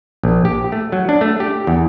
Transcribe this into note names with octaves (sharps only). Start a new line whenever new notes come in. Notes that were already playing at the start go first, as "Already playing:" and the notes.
A#1
G4
A3
F#3
D4
A3
G4
E2